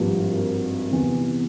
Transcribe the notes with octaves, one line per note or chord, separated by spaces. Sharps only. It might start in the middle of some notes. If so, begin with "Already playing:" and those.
Already playing: G#1 G2 F3 A#3
E2 C3 E3